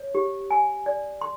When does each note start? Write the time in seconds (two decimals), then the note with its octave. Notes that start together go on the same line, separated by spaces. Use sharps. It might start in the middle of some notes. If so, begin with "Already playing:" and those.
Already playing: C#5
0.15 G4
0.51 G#5
0.86 D5
1.21 C6